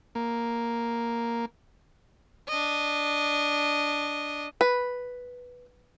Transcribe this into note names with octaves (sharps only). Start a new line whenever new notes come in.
A#3
D4 D#5
B4